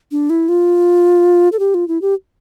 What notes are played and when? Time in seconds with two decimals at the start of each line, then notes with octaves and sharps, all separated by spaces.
0.12 D4
0.30 E4
0.49 F4
1.52 A4
1.59 G4
1.74 F4
1.88 E4
2.02 G4